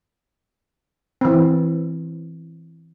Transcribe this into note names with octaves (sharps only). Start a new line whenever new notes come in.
E3 C4